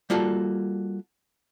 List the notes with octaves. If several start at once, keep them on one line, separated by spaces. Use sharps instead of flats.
G3 A#3 F4 F#4 A4